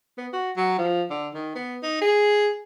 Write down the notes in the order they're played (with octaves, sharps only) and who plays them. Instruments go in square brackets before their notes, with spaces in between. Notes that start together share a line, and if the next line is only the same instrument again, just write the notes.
[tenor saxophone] B3
F#4
F#3
F3
D3
D#3
B3
D#4
G#4